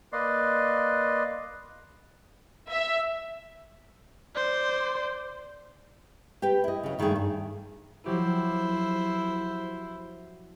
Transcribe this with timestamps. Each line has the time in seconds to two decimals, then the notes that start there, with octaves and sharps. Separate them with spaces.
0.12 A#3 B4 D5 D#5 C6
2.70 E5
4.36 C5 D5
6.42 G4 B4 G5
6.64 E4 D#5
6.83 C#3 F#3
6.99 G2 D#3 A3 A#3 G#4
7.16 G2
8.06 F3 F#3 E4 G4 C5